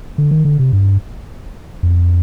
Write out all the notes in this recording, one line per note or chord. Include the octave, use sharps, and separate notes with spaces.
D3
D#3
D3
C3
G2
F2